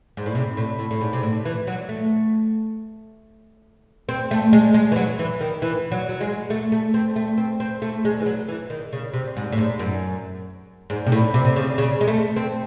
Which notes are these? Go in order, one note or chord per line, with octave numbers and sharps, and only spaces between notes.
G#2
A2
C3
A2
A2
A2
G#2
C3
A2
E3
F#3
A3
C4
A3
G#3
G#3
E3
F#3
E3
D#3
E3
F#3
F#3
G#3
A3
A3
C4
A3
C4
C4
A3
G#3
E3
F#3
E3
D#3
C#3
C3
G#2
A2
G#2
F#2
G#2
C3
A2
C3
C3
C#3
C#3
G#3
A3
C4